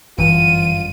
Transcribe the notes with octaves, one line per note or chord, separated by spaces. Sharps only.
G1 F#2 E3 F4 D#7